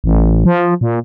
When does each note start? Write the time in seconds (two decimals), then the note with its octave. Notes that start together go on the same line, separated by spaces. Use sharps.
0.04 A1
0.45 F3
0.81 A#2